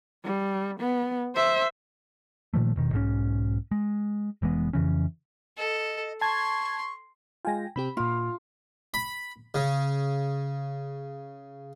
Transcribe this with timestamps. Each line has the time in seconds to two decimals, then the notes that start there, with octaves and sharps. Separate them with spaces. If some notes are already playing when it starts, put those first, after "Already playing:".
0.24 G3
0.80 B3
1.35 C5 E5
2.54 A#2 D#3 F3 A3
2.76 E1 B2 D#3
2.92 B1 G#2 E3 C#4
3.71 G#3
4.42 F1 E3 G#3 B3
4.73 F2 C#3 E3 C#4
5.58 A4 D#5
6.21 A5 C6 C#6 G#6
7.45 G#3 F4 G5 G#5 A#6
7.76 C3 C4 G4 B5
7.97 A#2 A#3 F4
8.94 B5
9.55 C#3